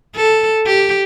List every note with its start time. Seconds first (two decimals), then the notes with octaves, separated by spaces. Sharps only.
0.16 A4
0.66 G4